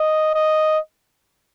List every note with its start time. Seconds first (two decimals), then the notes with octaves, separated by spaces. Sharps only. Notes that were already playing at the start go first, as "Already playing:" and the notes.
Already playing: D#5
0.34 D#5